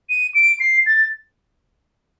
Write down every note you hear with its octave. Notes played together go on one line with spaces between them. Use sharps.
D#7
D7
C7
A6